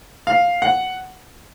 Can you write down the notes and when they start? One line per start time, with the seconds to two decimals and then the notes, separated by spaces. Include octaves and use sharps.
0.27 F5
0.62 F#5